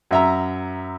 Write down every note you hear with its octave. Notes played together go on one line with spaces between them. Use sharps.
F#2 E5 A#5